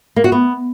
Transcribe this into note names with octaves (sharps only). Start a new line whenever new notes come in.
A#3
F#4
B3